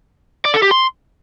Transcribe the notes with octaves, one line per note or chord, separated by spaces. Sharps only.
D5
A4
G4
C6